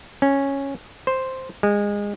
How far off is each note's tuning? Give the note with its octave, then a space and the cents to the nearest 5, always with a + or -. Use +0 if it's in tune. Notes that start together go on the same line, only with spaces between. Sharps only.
C#4 -5
C5 +0
G#3 -20